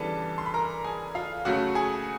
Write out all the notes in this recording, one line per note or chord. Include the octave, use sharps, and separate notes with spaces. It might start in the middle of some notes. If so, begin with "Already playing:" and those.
Already playing: C#3 E3 G3 B3 D4 A4 A5
C6
B5
A#4 A#5
G#4 G#5
F4 F5
C#3 F#3 A3 F#4 F#5
G#4 G#5